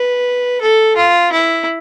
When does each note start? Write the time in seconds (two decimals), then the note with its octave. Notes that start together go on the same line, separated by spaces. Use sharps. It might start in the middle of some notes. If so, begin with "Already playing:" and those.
Already playing: B4
0.61 A4
0.96 F4
1.32 E4